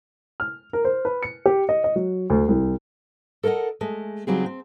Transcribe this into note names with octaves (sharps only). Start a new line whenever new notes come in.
F6
A#4
C5
B4
C#7
G4
D#5
D#5
F#3
D2
C2
A4 A#4 C#5 D#5 F#5
G#3 A3
C#3 F#3 G3 C4 D#4 G#4
C4